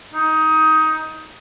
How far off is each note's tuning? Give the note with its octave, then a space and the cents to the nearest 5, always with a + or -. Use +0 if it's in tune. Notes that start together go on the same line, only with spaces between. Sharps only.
D#4 +15